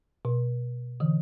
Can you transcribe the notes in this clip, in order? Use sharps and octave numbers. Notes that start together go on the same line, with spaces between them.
B2
D3 E3